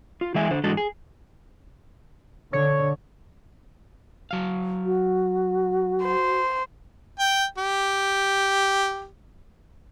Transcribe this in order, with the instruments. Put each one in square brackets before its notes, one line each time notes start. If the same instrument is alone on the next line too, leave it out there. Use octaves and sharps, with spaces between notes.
[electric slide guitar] F4
E3 G#3 E5 G#5
D3 C5
G#2 E3 G#3 D4 F#4 A4
G#4
[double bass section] D3 [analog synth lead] C#5
[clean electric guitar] F#3 F5
[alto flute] F#4
[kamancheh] C5
[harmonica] G5
G4